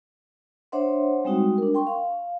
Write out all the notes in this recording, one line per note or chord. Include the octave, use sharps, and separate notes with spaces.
D4 C5 C#5 E5 F#5 C6
G3 G#3 C4 D#4 F#4
D4 A#4
G5 C6 C#6
F5